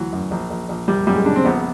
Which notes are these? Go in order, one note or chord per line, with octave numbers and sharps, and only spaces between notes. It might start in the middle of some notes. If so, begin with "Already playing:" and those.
Already playing: D2 E3 F#3
F#2
A#1
A#1
A#1
A#1 G3
F#2 G3
G#3
C#3 D4
C4
A#1 B3